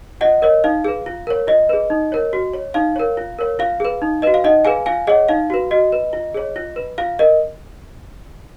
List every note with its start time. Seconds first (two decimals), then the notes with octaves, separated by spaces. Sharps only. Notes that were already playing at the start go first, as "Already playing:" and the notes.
0.21 F4 D#5 F#5
0.42 A#4 C#5 D#5
0.64 D#4 F5
0.84 G#4 B4
1.06 F4
1.27 A#4 C#5
1.47 F4 D#5
1.69 G#4 B4
1.90 D#4
2.12 A#4 C#5
2.33 F#4
2.53 C#5
2.74 D#4 F5
2.96 A#4 C#5
3.17 F4
3.39 A#4 C#5
3.59 F4 F5
3.80 G#4 B4
4.02 D#4
4.22 F#4 B4 D#5
4.34 F5
4.44 D#4 D#5 F#5
4.65 G#4 B4 F5 G#5
4.86 F4 F5 G#5
5.07 G#4 C#5 D#5 F#5
5.28 D#4 F5
5.50 F#4 B4
5.71 F#4 D#5
5.92 B4
6.13 F4
6.34 G#4 C#5
6.56 F4
6.76 B4
6.98 F4 F5
7.19 A#4 D#5